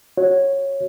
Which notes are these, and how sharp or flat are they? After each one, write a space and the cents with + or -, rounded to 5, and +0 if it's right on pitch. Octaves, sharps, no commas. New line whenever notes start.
F#4 +5 C#5 -10